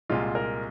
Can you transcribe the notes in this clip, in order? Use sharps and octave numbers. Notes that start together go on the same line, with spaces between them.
C2 A#2 G#3 F4
A#4